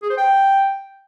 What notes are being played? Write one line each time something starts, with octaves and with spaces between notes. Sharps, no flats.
G#4
C5
G5